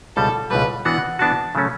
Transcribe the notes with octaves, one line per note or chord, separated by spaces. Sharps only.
C#2 B2 G3 A4
C#2 B2 G3 B4
E3 B3 D4 F#4 F#5
E3 B3 D4 F#4 A5
C#3 F#3 A3 C#4